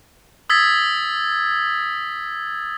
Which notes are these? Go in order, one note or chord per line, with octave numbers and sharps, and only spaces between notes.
D#6 E6 G#6 A6 B6